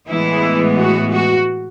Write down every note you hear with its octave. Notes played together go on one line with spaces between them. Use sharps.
A2 E3 G#3 B3 E4
F#4
F#4